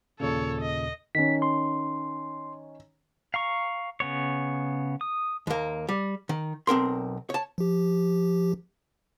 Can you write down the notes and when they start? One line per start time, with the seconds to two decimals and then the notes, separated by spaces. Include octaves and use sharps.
0.20 D#2 A#2 C#3 A4 C#5
0.62 D#5
1.15 D#3 C#4 B6
1.42 C6
3.34 F5 A#5 C#6
4.00 C#3 B3 C#5
5.01 D#6
5.47 D#2 A#3
5.89 G3
6.29 D#3
6.67 B1 C4 A#4 C6
7.30 C#5 A5
7.58 F3 G4